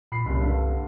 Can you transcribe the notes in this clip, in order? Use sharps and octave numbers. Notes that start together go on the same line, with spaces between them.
A#2 B5 C7
F#1 C2 C3
G2 D3